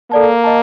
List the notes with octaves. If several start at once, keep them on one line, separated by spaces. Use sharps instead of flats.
A#3 A4 D5 A5
D#5 A5